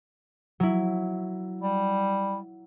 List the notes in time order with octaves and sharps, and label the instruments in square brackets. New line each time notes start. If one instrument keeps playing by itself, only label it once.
[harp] F#3 E4
[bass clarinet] G3